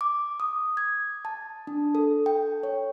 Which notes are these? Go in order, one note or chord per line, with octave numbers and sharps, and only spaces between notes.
D6
D#6
G#6
A5
D4
A4
G5
C#5